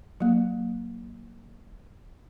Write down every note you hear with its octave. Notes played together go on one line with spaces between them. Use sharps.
F#3 A#3